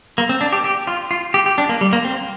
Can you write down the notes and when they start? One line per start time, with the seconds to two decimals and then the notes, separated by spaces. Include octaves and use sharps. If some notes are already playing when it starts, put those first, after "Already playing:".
0.18 A#3
0.29 C4
0.41 D4
0.53 G4
0.64 G4
0.87 F4
1.11 F4
1.34 G4
1.46 G4
1.58 D4
1.69 A#3
1.81 G3
1.93 A#3
2.05 C4